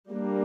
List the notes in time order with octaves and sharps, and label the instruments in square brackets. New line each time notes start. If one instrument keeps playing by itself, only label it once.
[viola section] G3 A#3 D4